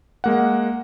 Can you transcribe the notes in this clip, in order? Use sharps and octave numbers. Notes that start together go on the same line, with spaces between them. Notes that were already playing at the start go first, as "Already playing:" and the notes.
G#3 A#3 F#5